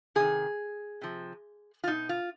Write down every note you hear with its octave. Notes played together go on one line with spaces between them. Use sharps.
C3 D#3 G#4
C3 F3
F4
B2 D#4
F4